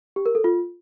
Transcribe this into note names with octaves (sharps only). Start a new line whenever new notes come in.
G4
A#4
A4
F4